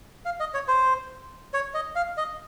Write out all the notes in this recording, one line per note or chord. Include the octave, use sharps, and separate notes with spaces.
F5
D#5
C#5
C5
C#5
D#5
F5
D#5